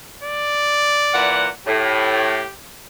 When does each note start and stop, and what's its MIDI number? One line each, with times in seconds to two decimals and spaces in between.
0.23 1.54 74
1.13 1.48 46
1.13 1.48 52
1.13 1.48 78
1.67 2.42 45
1.67 2.54 67